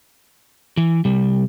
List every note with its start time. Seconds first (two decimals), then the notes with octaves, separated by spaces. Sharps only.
0.77 E3
1.05 C3 G3